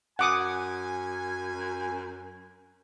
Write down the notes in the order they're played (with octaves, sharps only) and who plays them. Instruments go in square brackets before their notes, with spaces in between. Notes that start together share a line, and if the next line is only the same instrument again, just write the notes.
[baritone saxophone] F#2 [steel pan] F#5 D6 D#6 [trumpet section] G#5